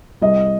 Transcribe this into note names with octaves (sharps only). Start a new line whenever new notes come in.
C2 D#5